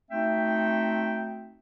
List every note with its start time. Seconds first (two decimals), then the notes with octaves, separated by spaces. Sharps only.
0.11 A3 C4 D#4 F#4 E5 G5